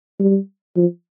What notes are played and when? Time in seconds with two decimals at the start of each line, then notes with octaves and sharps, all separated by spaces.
0.19 G3
0.77 F3